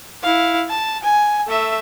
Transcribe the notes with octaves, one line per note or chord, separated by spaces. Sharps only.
E4 F5
A5
G#5
A3 E5